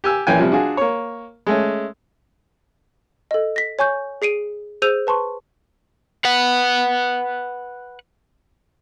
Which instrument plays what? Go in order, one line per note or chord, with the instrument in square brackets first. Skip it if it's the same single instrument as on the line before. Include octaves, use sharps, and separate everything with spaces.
[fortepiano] G4 G#5 E6
A#1 E3 C#4 G5 G#5
C3 F3 G3
D4 F4 F#4 G#4
A#3 C#5
G#3 A3 C#4
[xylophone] A4 D#5
A#6 B6
C#5 G#5 C#6 G6
G#4 C7 D7 D#7
G#4 C5 E6 G6 D#7 F7
B4 A5 C6 C#6
[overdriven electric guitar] B4 F#5